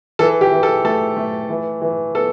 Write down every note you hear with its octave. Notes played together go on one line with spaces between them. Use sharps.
E3 A4
G4
E3
A4
A3 A4
A3
E3
E3
B3 A4